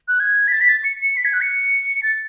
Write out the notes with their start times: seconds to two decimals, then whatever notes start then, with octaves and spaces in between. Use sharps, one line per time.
0.08 F#6
0.20 G#6
0.48 B6
0.52 A6
0.61 B6
0.69 A6
0.84 C#7
1.01 C#7
1.17 B6
1.25 G#6
1.33 F#6
1.41 C#7
2.03 A6